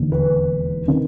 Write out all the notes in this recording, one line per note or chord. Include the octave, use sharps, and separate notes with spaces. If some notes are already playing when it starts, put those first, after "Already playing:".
Already playing: E1 D#2 D3
B4
C3 D#3